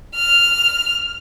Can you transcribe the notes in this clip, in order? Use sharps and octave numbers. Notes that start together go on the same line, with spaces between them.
F6